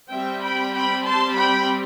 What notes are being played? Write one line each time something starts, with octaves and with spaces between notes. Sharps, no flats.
G3 C4 E5 G5
G5 B5
G5 B5
A5 C6
G5 B5